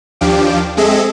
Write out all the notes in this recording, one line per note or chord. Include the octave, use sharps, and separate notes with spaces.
D#2 F3 D4 G4 F5 D6
G#3 C4 G#4 A4 D#5 E5